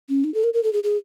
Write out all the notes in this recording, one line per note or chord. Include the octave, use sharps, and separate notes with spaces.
C#4
D#4
A4
A#4
A#4
A4
G#4
G#4